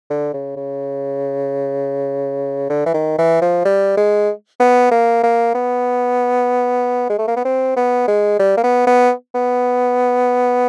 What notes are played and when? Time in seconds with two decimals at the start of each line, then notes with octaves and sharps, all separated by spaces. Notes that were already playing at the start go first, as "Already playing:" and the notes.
0.10 D3
0.34 C#3
0.56 C#3
2.70 D3
2.86 E3
2.94 D#3
3.18 E3
3.42 F3
3.65 G3
3.97 G#3
4.60 B3
4.91 A#3
5.23 A#3
5.55 B3
7.10 G#3
7.18 A3
7.27 A#3
7.36 B3
7.45 C4
7.76 B3
8.08 G#3
8.39 G3
8.57 A#3
8.64 B3
8.87 B3
9.35 B3